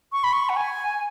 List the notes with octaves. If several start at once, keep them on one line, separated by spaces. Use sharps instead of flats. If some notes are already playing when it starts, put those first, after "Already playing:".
C#6
B5
C#6
F#5
G#5